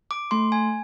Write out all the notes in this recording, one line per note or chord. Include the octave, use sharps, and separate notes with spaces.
D6
A3 C6
G#5